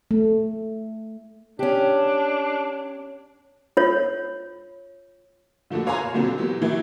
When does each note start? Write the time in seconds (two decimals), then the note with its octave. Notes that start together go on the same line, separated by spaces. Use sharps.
0.11 A3
1.59 C#4 D4 G4
3.77 F4 C#5
5.70 D3 F3 A3 A#3 F#4
5.86 B4 C#5 F5 G#5 A#5 C6
5.99 B2
6.14 A#2 D3 F#3 A#3 C4 F#4
6.38 E3 F#3 B3 G4
6.61 D#3 E3 F#3 A#3 E4